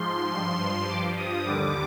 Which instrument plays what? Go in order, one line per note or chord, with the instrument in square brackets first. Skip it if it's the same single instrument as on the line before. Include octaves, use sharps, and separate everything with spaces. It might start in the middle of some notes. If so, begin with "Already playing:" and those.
Already playing: [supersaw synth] G#2 F3 C6
G2 F3 C6
G2 F3 D6
D#6
D#2 D3 G3 D6